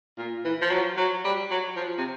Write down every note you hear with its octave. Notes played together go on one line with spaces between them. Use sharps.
A#2
E3
F3
F#3
F#3
G3
F#3
F3
C3